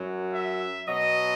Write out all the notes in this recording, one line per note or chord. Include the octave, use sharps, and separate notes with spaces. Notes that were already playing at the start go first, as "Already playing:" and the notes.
Already playing: F#2 F#3
E5
B2 F#3 D#5